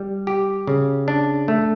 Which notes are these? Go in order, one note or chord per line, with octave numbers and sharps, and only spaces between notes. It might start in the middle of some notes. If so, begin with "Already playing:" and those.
Already playing: G3
G4
C#3
D4
A3